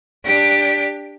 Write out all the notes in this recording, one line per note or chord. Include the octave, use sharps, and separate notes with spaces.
D4 G4